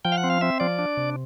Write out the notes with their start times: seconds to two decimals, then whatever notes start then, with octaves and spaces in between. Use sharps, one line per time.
0.05 F3 G5
0.12 F5
0.18 F#5
0.24 C4
0.30 F5
0.41 C4 E5
0.60 F3 D5
0.79 D4
0.97 C3